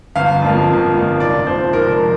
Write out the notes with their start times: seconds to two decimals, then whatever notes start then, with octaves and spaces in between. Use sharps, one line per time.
0.16 G1 F5
0.42 F2 F3 A#3
0.69 G1
0.94 F2 F3 A#3
1.20 F1 D5
1.46 F2 F3 C5
1.73 F1 A#4
1.99 F3